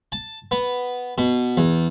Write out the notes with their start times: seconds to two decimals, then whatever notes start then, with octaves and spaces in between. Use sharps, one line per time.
0.12 A5
0.51 B3
1.18 B2
1.57 E2